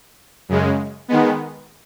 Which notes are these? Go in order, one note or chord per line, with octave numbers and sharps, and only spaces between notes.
F#2 C#3 G#3
D#3 G#3 B3